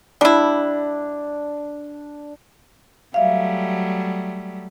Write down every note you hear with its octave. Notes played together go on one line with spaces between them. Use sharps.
G3 D4 E4
F#3 G3 A3 E5 F5